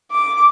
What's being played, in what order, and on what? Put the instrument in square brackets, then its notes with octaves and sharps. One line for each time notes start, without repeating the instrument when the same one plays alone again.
[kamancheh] D6